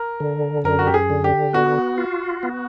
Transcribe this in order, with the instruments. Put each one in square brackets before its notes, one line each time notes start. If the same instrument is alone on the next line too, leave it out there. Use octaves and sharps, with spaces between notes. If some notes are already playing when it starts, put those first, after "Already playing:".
Already playing: [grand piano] A#4
[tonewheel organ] D3
[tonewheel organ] F#2 [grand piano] A#4
[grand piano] F#4
G4
G#4
[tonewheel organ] D3
[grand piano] G4
[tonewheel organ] B3 [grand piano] F#4
[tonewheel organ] F4
B3